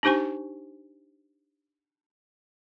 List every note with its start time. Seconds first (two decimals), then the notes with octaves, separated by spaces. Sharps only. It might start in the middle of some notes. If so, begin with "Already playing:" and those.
0.03 D4 D#4 G4 C5 G#5 C#6